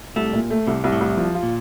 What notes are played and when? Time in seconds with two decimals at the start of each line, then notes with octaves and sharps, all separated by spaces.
0.16 C2 A3
0.33 A#2
0.50 A3
0.67 C2 C3
0.84 C2
0.92 A2
1.01 C2
1.17 F3
1.34 F4
1.43 A#2